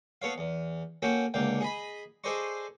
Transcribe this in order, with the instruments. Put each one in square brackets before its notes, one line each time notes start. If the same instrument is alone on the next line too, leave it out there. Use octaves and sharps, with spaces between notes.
[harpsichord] B3 A4 C#5 F5
E2
A#3 C#4 F#4 A4 G5
C#2 D3 A#3 G5
G#4 D#5 B5
G#4 A4 C5 D5 D#5 C#6